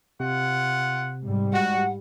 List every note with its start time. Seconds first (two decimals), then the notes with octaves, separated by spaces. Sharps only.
0.20 C3 F4 F#5
1.23 G#2 G3
1.53 G#3 F#4 F#5 C#7